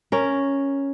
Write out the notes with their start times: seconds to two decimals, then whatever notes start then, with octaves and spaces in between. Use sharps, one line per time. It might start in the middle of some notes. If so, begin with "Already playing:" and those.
0.12 C#4 A#4